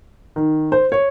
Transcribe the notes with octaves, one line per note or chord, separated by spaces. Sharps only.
D#3
C5
C#5